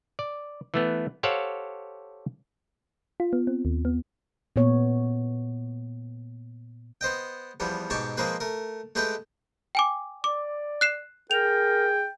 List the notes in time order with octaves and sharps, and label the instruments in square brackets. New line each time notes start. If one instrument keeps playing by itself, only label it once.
[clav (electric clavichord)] D5
E3 A3 B3
G4 A4 C5 C#5 F5 F#5
[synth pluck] F4
B3
C4
D#2
B3
[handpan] A#2 B3 C#5
[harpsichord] B3 C5 D#5 G5
E2 F3 G3 B3
G#2 B2 G4 A5 C#6 D6
F3 G#3 A#3 C4 G#4 B4
A3 A#4
G#3 A3 G4 B4 F#5 G5
[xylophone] G5 G#5 D6
[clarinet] D5 [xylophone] D6
[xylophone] F#6 C7 E7
[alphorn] G#4 [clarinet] A#4 [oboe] G5 [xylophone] F7